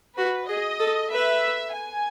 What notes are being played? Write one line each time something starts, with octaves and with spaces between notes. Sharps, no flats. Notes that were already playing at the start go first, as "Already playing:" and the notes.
F#4 B4
G#4 D#5
A4
B4 E5
G#5